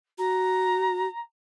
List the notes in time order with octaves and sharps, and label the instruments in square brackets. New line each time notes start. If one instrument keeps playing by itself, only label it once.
[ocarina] F#4 [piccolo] A#5